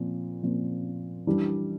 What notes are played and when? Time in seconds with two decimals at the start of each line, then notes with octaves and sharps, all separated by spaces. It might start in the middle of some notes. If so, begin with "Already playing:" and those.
Already playing: A#2 F3 C4
0.43 A#2 F3 C4
1.27 E3 G3 D4